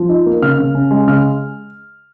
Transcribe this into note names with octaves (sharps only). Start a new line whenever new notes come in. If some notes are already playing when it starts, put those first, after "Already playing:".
Already playing: F3
D#4
A#3
C#3 F6
C#3
C#4
G#3
C#3 F6